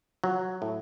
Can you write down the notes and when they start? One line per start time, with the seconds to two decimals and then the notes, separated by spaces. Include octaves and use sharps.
0.24 F#3
0.62 A2